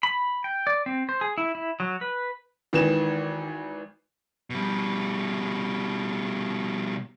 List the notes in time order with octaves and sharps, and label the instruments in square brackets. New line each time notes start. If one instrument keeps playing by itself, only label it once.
[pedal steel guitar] B5
G5
D5
C4
C5
G#4
E4
E4
F#3
B4
[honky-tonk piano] G#1 E3 E7 [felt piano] D#3
[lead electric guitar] B2 G3